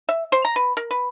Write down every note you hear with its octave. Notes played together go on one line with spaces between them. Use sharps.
E5
C5
A#5
B4
A#4
B4